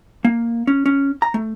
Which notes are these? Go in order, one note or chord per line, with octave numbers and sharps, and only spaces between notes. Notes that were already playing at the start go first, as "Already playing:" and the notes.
A#3
C#4
C#4
A#5
A3